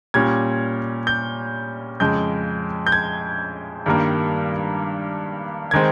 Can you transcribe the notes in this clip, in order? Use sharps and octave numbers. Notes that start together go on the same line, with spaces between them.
A#2 G3 C#4 G#6
G6
F2 C#3 G#3 G6
G6
G#6
G2 D#3 G3 A#3
D#3 G#3 C4 G#6